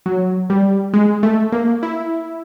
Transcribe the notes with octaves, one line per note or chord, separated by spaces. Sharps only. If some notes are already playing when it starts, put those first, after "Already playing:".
F#3
G3
G#3
A3
A#3
E4